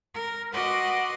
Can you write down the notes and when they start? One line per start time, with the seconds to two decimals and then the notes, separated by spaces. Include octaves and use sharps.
0.14 A#4
0.53 F#4 B4 D#5 F#5 C6 D6